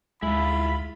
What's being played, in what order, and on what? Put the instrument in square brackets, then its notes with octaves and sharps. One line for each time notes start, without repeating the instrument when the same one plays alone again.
[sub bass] D2 [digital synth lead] G#3 [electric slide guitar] E4 F4 [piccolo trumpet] B5